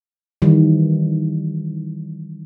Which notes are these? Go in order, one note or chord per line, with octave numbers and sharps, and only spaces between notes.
D#3 E3 G3